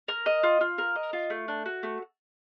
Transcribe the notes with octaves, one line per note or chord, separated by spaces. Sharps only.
A#4
D#5
F4
F4
A#4
D#5
F4
A3
D4
F#4
A3